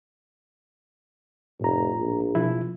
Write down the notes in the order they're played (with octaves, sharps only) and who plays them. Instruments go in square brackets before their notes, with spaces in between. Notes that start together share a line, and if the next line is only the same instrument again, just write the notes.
[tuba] F1 [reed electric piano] A2 A#5
[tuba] A#1
[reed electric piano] B2 F3 E4